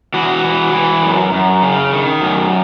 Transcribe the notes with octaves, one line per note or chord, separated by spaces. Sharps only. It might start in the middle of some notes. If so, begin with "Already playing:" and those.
E3 F#4
E3
E3
F#2
F#2
C#3
D#3
F#2